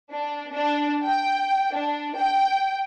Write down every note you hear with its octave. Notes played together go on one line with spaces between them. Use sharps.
D4
D4
G5
D4
G5